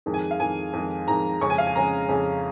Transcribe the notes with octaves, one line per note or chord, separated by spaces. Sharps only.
F2 D#3 G#3
G#5
F5
F2 D#3 G#3 G#5
F2 D#3 G#3
F2 D#3 G#3 A#5
F2 C#3 G#3 C#4 C#6
G#5
F5
G#5
F2 C#3 G#3 C#4 A#5
F2 C#3 G#3 C#4